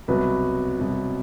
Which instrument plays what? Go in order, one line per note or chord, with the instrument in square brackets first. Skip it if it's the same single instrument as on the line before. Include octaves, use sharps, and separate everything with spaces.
[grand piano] C2 B2 F#3 B4
C2 B2 F#3